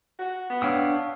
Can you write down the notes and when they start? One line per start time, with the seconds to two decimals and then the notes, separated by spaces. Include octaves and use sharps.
0.19 F#4
0.50 B3
0.62 D4 C#5 F5 G5 D#6 E6